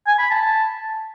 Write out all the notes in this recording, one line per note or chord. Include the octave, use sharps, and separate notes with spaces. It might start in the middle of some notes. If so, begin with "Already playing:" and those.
G#5
B5
A5